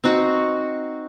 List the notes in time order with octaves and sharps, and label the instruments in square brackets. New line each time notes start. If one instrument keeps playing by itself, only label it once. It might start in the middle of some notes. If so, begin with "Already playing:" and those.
[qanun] C4 D#4 F#4